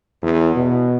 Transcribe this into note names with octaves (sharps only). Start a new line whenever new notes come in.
E2
B2